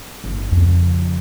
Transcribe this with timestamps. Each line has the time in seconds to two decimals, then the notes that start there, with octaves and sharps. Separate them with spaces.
0.24 G1
0.52 F2 C#3